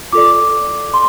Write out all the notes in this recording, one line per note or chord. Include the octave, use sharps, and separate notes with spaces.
F4 A4 D5 D6
C6